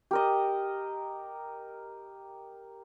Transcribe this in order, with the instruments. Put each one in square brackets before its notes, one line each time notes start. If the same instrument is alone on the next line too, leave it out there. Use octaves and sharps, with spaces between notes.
[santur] G4 A#4 D#5